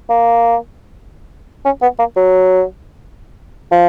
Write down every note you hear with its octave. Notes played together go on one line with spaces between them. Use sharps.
A#3
C#4
B3
A#3
F#3
F3